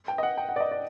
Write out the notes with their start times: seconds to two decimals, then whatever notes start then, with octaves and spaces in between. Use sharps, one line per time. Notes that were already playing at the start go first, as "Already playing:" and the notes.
0.08 G5
0.18 D#5
0.23 F#5
0.38 G5
0.49 F#5
0.56 D5
0.60 D#5
0.71 D5